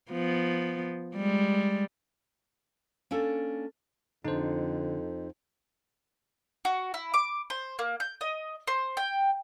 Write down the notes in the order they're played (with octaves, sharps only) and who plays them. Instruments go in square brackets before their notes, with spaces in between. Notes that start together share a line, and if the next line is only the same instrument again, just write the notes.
[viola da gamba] F3 B3
G3 G#3
[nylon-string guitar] A#3 C#4 D4 A4
[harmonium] F2 [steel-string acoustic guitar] D3 [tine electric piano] D#4 C5
[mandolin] F#4
E4
D6
C5
A#3
G6
D#5
C5
G5